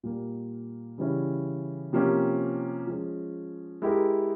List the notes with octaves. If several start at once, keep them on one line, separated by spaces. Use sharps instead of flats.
A#2 G3 A#3
C#3 E3 G3 C#4 E4
C3 F3 A#3 C#4 G4
F3 G#3 C#4
G#3 E4 G4 A#4